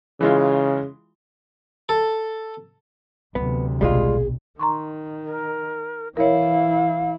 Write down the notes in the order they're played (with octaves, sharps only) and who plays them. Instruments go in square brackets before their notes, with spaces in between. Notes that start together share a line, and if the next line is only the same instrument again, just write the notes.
[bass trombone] C#3 [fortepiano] E3 G#3 F4
[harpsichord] A4
[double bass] D2 C3 [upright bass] E3 F#3 [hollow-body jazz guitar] B3
[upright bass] A#1 B2 [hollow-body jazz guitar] G3 G#3 F4 [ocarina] G#4
[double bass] D#3 [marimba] A#5 C6 C#6
[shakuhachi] A#4
[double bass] E3 E4 [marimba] A#4 C#5 [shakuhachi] F5